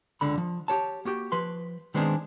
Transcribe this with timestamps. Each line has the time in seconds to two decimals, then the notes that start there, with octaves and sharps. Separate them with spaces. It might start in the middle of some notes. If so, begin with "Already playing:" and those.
0.21 C#2 D3 B5
0.38 F3
0.68 G4 C#5 A5
1.05 A#3 F#4 G4
1.32 F3 B4 C6
1.94 D#3 G#3 B3 C4 D4 G#4